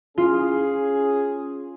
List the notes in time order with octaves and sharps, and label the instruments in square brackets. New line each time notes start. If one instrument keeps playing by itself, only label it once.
[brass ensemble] C#4 G#4 [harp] F4